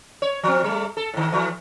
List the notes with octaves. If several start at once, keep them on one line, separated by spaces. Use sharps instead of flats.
C#5
F3 C4
G3 A3
A4
A2 D#3
E3 F3